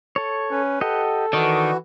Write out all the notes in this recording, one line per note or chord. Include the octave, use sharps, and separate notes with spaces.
A4 C#5
C#4 B4
G4 A4 D#5 F#5
D#3 E3 F#4 D5 D#5 C#6